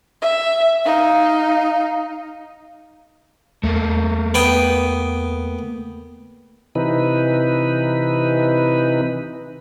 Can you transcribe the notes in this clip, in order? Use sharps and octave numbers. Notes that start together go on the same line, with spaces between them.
E5
D#4 F5
E2 A3 A#3
B3 G5 D#6
C3 E3 D#4 B4